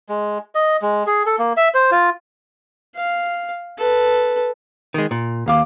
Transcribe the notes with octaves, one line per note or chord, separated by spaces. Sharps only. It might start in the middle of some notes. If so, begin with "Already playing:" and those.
G#3
D#5
G#3
G#4
A4
A#3
E5
C5
F4
F5
A4 B4
D#3 G#3
A#2
D#2 F5 D6